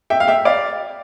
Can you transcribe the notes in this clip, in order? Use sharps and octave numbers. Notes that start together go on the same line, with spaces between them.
E5 G5
F5
E5 G5
D5 F5